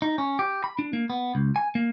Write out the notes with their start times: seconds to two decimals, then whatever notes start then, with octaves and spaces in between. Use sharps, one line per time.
0.02 D#4
0.18 C#4
0.39 G4
0.64 B5
0.79 D4
0.93 A#3
1.10 B3
1.35 C#2
1.56 G#5
1.75 A#3